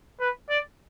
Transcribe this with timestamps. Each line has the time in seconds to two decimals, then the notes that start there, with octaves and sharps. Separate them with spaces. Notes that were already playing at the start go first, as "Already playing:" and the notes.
0.20 B4
0.50 D5